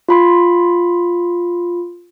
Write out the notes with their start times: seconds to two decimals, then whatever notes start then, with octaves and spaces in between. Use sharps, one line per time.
0.09 F4 B5 C6